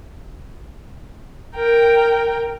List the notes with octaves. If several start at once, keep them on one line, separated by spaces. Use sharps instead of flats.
A#4 G5